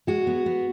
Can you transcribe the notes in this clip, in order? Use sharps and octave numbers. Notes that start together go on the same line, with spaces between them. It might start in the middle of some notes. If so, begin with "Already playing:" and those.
G#3 F#4
B3
B3